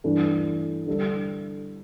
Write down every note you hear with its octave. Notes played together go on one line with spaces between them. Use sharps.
G2 E3 A3 D4
D3 G3 D4 A4